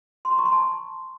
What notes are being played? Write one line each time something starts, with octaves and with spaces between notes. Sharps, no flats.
C6
A#5
C#6
C6
A5